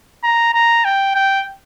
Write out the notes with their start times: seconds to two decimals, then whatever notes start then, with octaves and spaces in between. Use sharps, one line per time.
0.24 A#5
0.54 A#5
0.84 G5
1.15 G5